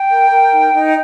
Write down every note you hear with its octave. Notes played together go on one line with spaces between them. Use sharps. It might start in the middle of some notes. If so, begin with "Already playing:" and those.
Already playing: G5
A#4
A#4
D#4
D#4